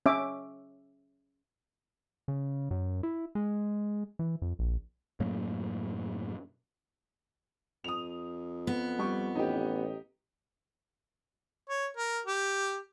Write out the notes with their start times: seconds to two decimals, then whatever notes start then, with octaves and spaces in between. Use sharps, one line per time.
0.06 C#4 E5 D6
2.28 C#3
2.71 F#2
3.03 E4
3.35 G#3
4.19 E3
4.42 F2
4.59 A#1
5.20 F#2 A2 F#3 A#3
7.84 F2 D#6 F7
8.67 B3
8.99 G3 C#6
9.35 A1 D#4 G4
11.69 C#5
11.97 A#4
12.26 G4